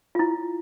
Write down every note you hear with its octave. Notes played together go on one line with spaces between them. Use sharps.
F4
E4